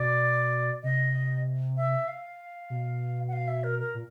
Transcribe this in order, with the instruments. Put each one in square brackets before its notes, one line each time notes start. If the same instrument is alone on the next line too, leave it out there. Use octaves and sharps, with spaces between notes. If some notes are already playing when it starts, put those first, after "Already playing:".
Already playing: [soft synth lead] B2 [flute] D5
[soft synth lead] C3 [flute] D#5
[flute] E5
F5
[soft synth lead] B2
[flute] F#5
F5
E5
A#4
A#4
[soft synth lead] A#2